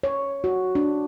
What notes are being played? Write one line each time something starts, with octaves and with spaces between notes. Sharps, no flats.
C#5
F#4
D4